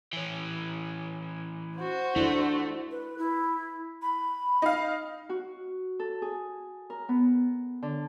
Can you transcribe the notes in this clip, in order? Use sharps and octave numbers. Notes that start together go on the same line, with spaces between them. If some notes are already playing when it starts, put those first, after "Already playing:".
E3 C#4
F#4 C5
A3 D4 E4
B4
E4
B5
D#4 F5
F#4
A4
G#4
A#4
B3
D3